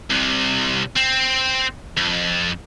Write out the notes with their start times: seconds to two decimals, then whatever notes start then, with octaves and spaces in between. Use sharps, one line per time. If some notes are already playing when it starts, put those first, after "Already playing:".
0.10 C2 C3
0.96 C4
1.97 F2